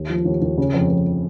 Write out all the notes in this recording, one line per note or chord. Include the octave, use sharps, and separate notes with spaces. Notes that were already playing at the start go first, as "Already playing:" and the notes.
Already playing: D#2
F3
D#2
D#2
C#3
F2
F2